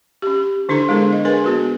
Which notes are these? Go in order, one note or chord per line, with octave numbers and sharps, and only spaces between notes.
C#4 G4
D3 D4 E4 A4 A#5
G#3 B3 D4 E4 G#4 A#4
D#5
D4 G#4 A#4 B4 G#5
B3 F#4 G#4